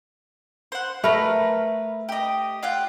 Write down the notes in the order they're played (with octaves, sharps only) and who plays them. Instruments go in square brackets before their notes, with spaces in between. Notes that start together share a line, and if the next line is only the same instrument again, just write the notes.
[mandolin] C5 F#5
[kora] A3 [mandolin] A#4 B4 F6
[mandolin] G4 D#5
F4 F#5 G5